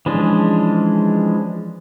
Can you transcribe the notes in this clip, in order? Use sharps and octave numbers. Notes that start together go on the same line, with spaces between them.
E3 F3 G#3 C#4 D4